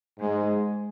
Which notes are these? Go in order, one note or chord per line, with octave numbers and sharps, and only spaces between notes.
G#2 G#3